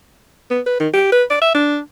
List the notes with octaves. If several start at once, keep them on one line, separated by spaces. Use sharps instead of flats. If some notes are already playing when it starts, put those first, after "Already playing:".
B3
B4
D#3
G4
B4
D5
E5
D4